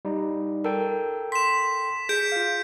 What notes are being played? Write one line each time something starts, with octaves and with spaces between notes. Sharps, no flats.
G3 D#4
A4 A#4 G5
C6 B6 E7
G#4 G6 B6 D7
F4 F5